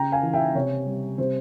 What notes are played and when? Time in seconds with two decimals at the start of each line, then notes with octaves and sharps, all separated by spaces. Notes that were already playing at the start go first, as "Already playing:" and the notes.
Already playing: C#3 G5 A#5
0.12 F5 G#5
0.23 E3
0.33 E5 G5
0.55 C3 C#5
0.86 G3
1.18 C3 C5